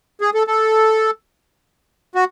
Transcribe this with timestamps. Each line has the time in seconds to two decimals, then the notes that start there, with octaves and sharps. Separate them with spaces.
0.21 G#4
0.34 A4
0.47 A4
2.15 F#4